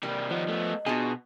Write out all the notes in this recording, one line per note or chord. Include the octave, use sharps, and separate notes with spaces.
C3 G3 A#3
D#3 F3 B3 D#5
A3 B3
B2 B3 D4 F4 F#4 G#4